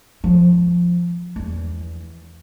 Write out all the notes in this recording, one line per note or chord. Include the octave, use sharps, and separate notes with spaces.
F3
E2